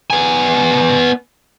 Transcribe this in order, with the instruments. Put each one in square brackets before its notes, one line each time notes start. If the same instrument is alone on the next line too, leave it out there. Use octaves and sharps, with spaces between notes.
[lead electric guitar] B3 G#5